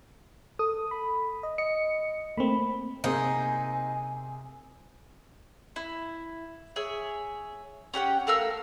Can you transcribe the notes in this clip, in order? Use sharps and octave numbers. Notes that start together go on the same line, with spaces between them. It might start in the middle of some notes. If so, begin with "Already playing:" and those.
A4 D#6
B5
D#5
D#5 C#7
A3 A#3 C4 B5
C3 A#3 C4 D#4 G#4 G#5
E4
G#4 C#5 E5
C#4 G4 F#5 G5
A3 A#4 F5 E6